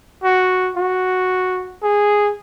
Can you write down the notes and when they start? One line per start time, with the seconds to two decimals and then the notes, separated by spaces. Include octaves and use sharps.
0.24 F#4
0.76 F#4
1.82 G#4